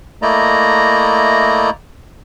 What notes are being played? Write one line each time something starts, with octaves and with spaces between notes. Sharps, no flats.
A3 A#3 E4 D5 D#5 A#5